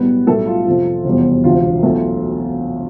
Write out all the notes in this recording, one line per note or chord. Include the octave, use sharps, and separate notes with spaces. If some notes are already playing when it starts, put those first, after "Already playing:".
Already playing: B1 A2 G3 B3 B4
B1 A2 G3 A3 A4
F4
F2 C3 F3
F1 E2 B2 G3
E1 D2 C3 F4
B1 B2 A3